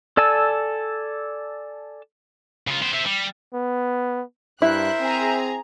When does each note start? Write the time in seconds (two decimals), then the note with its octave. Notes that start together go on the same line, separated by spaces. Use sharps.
0.17 A4 D5 G#5 A5 E6
2.67 C#3 F4
2.82 B3 C5
2.93 C5 E5
3.06 G3
3.54 B3
4.62 G2 E4 A#4 C5 E5 F#6
5.01 C4 G#4 A#5